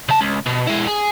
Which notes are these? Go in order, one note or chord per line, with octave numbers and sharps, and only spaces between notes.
C#3 A5
C#2
B2
G#3 E4
G#4